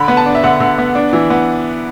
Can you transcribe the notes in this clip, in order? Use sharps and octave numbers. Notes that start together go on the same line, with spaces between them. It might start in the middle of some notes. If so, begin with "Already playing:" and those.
Already playing: D3 B5
B3
A5
D4
E5
D3 F#5
D3
B3
D4
E3
B3